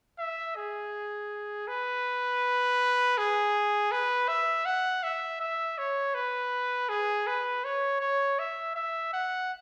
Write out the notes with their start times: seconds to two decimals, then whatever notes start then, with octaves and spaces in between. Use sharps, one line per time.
0.19 E5
0.56 G#4
1.67 B4
3.18 G#4
3.92 B4
4.28 E5
4.65 F#5
5.03 E5
5.40 E5
5.78 C#5
6.14 B4
6.89 G#4
7.27 B4
7.64 C#5
8.00 C#5
8.39 E5
8.75 E5
9.13 F#5